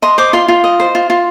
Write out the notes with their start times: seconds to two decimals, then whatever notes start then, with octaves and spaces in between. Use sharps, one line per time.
0.02 D#5 C6
0.18 C5 D6
0.33 F4 C6
0.48 F4
0.64 D#5
0.80 C5
0.95 F4
1.10 F4